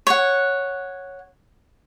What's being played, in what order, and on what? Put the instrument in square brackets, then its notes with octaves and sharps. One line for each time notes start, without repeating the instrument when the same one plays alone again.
[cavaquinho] C#5 F#5